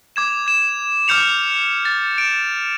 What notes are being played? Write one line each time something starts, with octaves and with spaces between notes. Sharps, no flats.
D6 G#6 E7
G#6 E7
D6 F6 G6 C#7 F7
A6
D7 E7